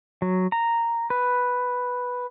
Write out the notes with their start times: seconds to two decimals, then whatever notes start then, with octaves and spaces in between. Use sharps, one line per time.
0.22 F#3
0.52 A#5
1.10 B4